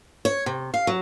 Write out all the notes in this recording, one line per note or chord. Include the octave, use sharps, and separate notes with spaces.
C#5
C3
F5
F#3